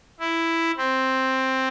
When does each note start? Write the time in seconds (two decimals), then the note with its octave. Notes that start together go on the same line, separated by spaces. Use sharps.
0.20 E4
0.78 C4